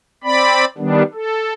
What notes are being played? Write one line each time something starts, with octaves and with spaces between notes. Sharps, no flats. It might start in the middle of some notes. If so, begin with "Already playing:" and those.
C4 D5 B5
D#3 G3 B3 D4
A4